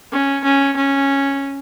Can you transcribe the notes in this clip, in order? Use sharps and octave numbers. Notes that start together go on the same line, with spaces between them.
C#4
C#4
C#4